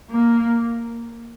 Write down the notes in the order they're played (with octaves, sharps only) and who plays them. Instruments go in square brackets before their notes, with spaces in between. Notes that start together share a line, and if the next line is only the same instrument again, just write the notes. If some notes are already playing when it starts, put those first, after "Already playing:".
[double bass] A#3